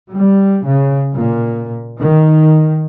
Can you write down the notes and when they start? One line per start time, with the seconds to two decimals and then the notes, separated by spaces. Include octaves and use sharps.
0.13 G3
0.64 C#3
1.14 A#2
1.99 D#3